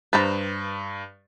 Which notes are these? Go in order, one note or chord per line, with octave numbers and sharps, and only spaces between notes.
G2 B4 C5 A#5 A6